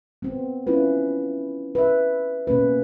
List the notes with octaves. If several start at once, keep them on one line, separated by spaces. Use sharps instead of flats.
B3 C4
C#4 E4 F4 B4
B4 E5
B2 A#3 C#4 B4